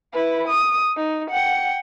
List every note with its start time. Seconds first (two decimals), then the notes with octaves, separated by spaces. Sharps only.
0.13 E4 B4
0.48 D#6
0.97 D#4
1.31 F#5 G5